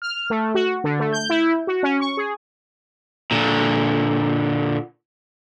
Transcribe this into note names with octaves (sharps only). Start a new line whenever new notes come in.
F6
A3
F#4
D3
A3
G6
E4
F#4
C#4
C#6
G#4
A#2 D3